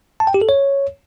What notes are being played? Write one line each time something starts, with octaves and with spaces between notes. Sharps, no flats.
A5
G5
G4
A4
C#5